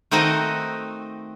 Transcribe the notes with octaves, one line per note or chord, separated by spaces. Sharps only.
D#3 A3 C4 D#4 F#4 D#5